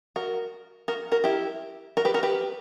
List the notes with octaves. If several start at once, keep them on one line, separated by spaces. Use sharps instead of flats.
F#4 A#4
F#4 A#4
F#4 A#4
E4 G4
F#4 A#4
G4 B4
F#4 A#4
G4 B4